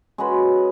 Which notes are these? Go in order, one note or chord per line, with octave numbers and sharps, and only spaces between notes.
G#3 C#4 F#4 B4